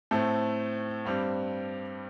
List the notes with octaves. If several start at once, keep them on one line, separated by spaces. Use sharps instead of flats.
A2 A3 C4
G2 G3 C4